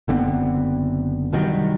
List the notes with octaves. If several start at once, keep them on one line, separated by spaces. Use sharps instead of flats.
F#1 D3 B3 C4
C2 D#3 F#3 G3